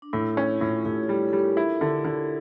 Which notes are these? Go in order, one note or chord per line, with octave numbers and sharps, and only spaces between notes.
D4
A2 E4
C#4
E4
F4
A2 E4
A2 E4 G4
E4 G4
G3
G3 A4
G4 A#4
E4
D3
D3